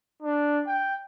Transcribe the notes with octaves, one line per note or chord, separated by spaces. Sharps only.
D4
G5